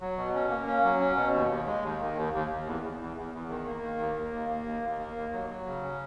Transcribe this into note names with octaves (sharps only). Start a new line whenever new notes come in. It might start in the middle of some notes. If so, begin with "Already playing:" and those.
F#3
B2
C#4
A#3
C#4
F#3
C#4
B2
D#2
D#2
G#3
D#2
D#3
D#2
D#2
D#2
E2
E2
E2
E2
E2
D#3
A#3
D#3
D#2
A#3
D#2
A#3
D#2
D#2
A#3
D#2
F#3
F#3
C#3
C#4